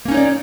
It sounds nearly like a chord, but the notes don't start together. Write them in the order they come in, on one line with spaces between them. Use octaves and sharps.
A#3 C#4 D#4 C#5 D5